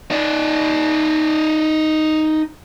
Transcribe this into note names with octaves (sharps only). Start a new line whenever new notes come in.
D#4 D5